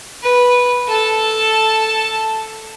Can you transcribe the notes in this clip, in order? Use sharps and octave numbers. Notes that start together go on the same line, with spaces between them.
B4
A4 A5